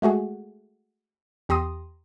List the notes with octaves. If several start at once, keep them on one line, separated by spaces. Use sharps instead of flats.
G#3 A3 F#4 G#4
E2 G4 A#5 C6 D#6